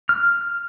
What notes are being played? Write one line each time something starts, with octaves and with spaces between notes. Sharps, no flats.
F6